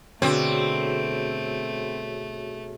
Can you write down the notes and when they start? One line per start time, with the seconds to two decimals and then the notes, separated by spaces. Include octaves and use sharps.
0.22 B2 D3 A3 C4 F#4 G#4 C#5